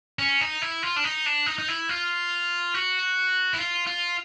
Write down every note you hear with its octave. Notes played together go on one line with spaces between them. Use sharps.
C#4
D#4
E4
F4
D4
D#4
D4
D#4
D#4
E4
F4
F#4
E4
F4
F4